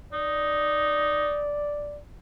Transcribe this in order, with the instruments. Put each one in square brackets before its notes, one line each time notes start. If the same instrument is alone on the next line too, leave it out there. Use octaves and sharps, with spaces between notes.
[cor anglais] D#4 [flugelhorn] D5